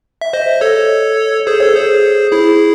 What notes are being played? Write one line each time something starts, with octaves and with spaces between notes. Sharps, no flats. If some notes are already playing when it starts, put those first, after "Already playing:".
E5
C5 D#5
A4 C#5
G#4 C5
A4 C#5
G#4 C5
E4 G#4